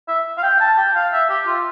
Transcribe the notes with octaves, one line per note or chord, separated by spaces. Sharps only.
E5
F5
G5
A5
G5
F5
E5
G4
F4